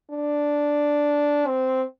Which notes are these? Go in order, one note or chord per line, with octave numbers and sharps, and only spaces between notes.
D4
C4